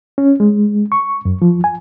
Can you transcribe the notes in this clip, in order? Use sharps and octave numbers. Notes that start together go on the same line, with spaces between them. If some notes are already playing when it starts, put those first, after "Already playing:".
C#4
G#3
C#6
F#2
F3
G#5